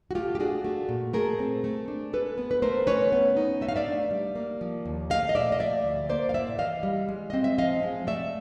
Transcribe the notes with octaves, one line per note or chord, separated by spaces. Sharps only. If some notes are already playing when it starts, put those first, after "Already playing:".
F#4
A3 F4 G4
G4
D4 F#4 G#4
A3
A#2
A3 G#4 A#4
C4
A3
D4
G#3 A4 B4
B3
B4
A3 A#4 C5
C#4 B4 C#5
B3
D#4
A3 E5
F5
D5 E5
D4
G3
A#3
F3
D#2
A3 D#5 F5
D#5
A#2 D5 E5
D#5
F3 D5 E5
D2
A#3 C5 D5
F5
A2 D5 E5
E3 D#5 F5
G3
G#3
C4 D#5
E5
F3 D#5 F5
G#3
A3 D5 E5